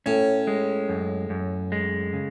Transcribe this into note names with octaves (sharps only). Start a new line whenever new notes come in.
A2 C#4
G#3
F#2
F#2
G#3
C#3